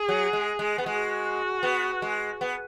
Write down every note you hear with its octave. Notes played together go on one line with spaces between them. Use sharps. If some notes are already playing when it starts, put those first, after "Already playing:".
Already playing: G#4
F#3
G#3
G#3
B3
G#3 F#4
B3
G#3
B3